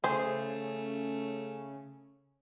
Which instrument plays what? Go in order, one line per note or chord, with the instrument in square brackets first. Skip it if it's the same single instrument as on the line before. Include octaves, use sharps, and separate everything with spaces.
[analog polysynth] C#3 [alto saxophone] A3 [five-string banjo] G#4 C5